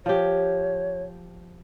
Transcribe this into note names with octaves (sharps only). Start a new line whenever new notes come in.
F3 G4 C#5